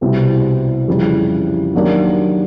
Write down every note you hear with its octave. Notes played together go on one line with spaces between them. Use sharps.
C2 B2 G3 C4 E4
F2 C#3 E3 G3
D#3 F#3 A#3 D4 G4